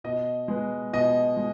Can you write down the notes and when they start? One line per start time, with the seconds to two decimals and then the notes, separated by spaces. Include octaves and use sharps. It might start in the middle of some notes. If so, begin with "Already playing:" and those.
0.04 B2 D#5
0.48 G#3 B3
0.93 B2 D#5
1.37 G#3